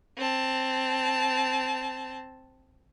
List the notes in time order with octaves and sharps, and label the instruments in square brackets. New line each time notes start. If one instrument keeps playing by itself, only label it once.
[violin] C4 A5